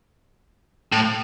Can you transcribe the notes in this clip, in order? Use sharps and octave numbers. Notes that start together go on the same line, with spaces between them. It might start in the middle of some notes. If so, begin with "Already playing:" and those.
A2